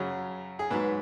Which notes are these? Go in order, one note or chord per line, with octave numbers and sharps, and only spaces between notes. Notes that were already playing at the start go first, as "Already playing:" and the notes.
Already playing: F#2 C#3 F#3
G#4
G#2 F#3 B4